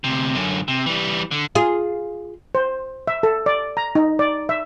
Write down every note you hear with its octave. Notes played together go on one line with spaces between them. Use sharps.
D2 C3
F#2 D3
C3
E3 G3
D3
F4 G#4
C5
E5
A4
D5
A#5
D#4
D5
E5